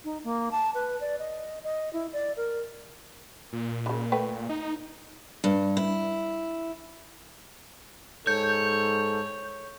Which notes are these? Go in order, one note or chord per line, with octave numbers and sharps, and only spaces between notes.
D#4
A#3
A5
B4
D5
D#5
D#5
E4
D5
A#4
A#2
C#3 E3
A3 B4 G5
D#4
G2
E4
G#2 A4 C#5 G6